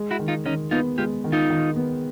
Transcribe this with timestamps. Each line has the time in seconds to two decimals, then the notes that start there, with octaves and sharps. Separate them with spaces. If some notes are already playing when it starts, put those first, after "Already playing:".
Already playing: G#3
0.11 E4 F#4
0.19 D#3
0.28 D#4 F4
0.46 D#3 C#4 D#4
0.71 B3 D#4 F4
0.98 G#3 F4 G4
1.24 D#3
1.32 D#4 F4
1.50 D#3
1.76 B3